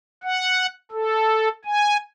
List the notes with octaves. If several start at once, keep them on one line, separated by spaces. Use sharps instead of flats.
F#5
A4
G#5